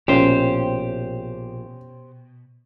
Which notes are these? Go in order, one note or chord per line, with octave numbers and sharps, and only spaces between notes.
A#1 B2 C#4 G4 C5